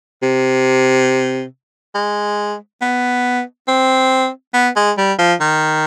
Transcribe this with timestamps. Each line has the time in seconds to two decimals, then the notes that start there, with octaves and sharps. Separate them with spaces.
0.22 C3
1.94 G#3
2.81 B3
3.68 C4
4.54 B3
4.76 G#3
4.98 G3
5.19 F3
5.40 D#3